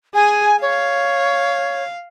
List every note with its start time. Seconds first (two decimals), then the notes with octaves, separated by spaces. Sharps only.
0.15 G#4 G#5
0.62 C#5 F5